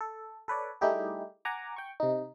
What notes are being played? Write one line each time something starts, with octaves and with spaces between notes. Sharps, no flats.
A4
A4 B4 C#5 D5
G3 A3 D#4 E4 G4 G#4
F#5 G#5 A#5 D6
G5 C#6
C3 D#4